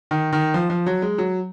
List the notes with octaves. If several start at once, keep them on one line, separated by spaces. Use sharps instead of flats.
D#3
D#3
F3
F3
F#3
G#3
F#3